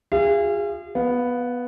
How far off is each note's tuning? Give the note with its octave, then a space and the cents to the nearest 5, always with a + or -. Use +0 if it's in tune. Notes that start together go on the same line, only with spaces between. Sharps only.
F4 +35 G#4 -30 F5 -45
B3 +0 F5 +25